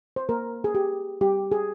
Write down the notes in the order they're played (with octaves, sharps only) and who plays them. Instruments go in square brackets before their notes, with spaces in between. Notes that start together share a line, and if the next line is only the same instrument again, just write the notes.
[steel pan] C5
A#3 A#4
G#4
G4
G3 G4
G#4